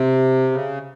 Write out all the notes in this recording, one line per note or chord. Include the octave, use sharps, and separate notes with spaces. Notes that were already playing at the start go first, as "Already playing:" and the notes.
Already playing: C3
C#3